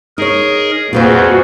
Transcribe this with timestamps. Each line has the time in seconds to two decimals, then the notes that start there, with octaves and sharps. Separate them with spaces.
0.18 D#4 G#4 A#4 C#5
0.93 F2 A#2 F4 F#4 G#4 B4 C5